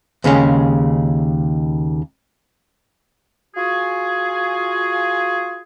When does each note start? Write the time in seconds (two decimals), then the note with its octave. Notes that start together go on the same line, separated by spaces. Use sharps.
0.24 D#2 C#3 G#3 C#4
3.56 F4 F#4 G#4